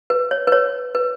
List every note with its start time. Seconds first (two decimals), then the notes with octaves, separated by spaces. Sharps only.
0.10 B4
0.31 C#5
0.47 B4
0.52 C#5
0.95 B4